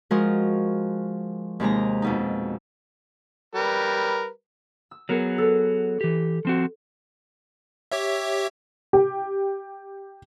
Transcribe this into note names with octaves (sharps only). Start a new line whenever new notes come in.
F3 G#3 F#4 A#4
D#2 C3 G#3 A#5
F2 B2 D#4
G3 A#4 B4
E6
F#3 B3 G#4 A#4
A4 B4
E3 G4
F3 C4 F#4
G4 C#5 E5
G4